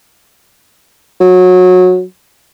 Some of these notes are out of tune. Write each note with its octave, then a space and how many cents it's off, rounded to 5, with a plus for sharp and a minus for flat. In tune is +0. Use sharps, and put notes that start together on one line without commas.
F#3 -20